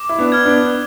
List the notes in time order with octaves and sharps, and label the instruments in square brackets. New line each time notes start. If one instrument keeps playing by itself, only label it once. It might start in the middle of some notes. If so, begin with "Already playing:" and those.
Already playing: [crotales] D6
[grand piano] E4
B3 D4
[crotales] F6 G#6
[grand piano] B3 D4